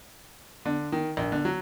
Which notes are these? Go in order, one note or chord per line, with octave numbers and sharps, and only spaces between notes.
D3
D#3
A#1
D3
F#3